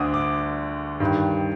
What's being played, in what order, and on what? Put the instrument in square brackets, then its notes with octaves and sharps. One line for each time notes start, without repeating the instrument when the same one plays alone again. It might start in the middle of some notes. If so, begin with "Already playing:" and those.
Already playing: [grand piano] D2 D3 D6 D#6
D6
G2 D#3